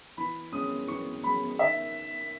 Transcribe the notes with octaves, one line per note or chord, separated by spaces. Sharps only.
E3 B5
G#3 C#4 D#6
E3 C#6
G#3 C#4 B5
D#3 E5